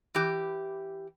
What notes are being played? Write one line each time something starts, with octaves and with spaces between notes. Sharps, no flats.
E3 G4